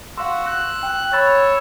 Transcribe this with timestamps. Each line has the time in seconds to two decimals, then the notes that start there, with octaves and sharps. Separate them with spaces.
0.17 F#4 F5 C6 E6
0.47 F#6
0.83 G5
1.13 C#5 B5 E6 A6